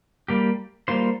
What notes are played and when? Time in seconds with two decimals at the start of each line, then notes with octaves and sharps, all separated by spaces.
0.28 G3 A#3 G4
0.88 G3 A#3 F4 C5